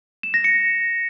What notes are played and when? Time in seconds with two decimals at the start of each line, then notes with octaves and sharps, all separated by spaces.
0.23 E7
0.34 A#6
0.44 C#7